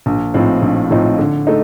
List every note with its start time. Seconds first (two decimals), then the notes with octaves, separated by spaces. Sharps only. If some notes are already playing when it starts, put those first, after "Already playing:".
0.06 A#1
0.34 A2 F3 C4 D#4
0.62 A#1
0.91 A2 F3 C4 D#4
1.19 D3
1.47 A3 D#4